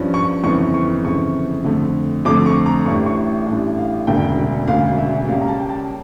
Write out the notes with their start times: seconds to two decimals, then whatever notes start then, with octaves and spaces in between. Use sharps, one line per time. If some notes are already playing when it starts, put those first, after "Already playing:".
Already playing: G2 F3 C#4
0.14 C#6
0.43 G1 F2 C#3 E3 C#6
0.74 C#6
1.05 G1 F2 C#3 E3 C#6
1.65 F2 D3 A3
2.25 F2 D3 A3 D6
2.46 C#6
2.66 A#5
2.86 A1 A2 G3 D4 C#6
3.06 C#6
3.46 A1 A2 G3 D4
3.78 F5
4.07 E1 D2 C#3 G5
4.68 E1 D2 C#3 F5
4.98 E5
5.28 C#2 C#3 G3 A#3 C#4 F5
5.41 A#5
5.48 A5
5.60 G5
5.69 A5